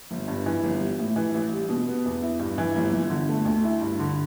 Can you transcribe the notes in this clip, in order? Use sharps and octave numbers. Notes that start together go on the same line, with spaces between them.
G1
G2
E3
G1
G3
A2
E3
A1
G3
B2
B3
E2
E4
G2
E3
G1
G1
D3
A3
D2
E4
G2
D3